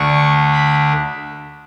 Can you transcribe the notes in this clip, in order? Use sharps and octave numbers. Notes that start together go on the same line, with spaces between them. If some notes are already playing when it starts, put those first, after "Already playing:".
Already playing: D2 D3 A3 D4 C#6
B5